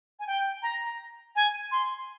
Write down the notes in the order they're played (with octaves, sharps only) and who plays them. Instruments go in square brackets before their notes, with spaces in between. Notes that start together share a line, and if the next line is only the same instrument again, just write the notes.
[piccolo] G#5
G5
A#5
G#5
C6